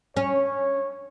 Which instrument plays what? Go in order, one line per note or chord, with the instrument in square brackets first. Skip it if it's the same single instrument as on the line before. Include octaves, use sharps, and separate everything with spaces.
[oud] C#4 [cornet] C#5